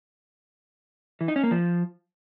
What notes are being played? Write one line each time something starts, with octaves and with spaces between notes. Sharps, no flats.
E3
D#4
C#4
A#3
F3